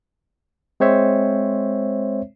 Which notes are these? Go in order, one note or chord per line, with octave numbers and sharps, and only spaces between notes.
G#3 C4 C5 C#5 E5